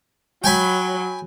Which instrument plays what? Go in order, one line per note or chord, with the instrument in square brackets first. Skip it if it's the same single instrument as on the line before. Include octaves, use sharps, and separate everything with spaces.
[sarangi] F#3 [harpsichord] G5 G#5 B5